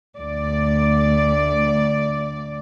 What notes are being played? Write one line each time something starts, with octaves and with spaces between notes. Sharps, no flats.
D2 D5